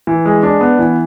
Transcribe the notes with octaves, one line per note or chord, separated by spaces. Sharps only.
E3
G#3
D4
B3
E3